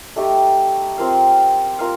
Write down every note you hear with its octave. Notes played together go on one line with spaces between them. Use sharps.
A3 D#4 G4
C4 F4 A#4 F5
F4 A#4 F5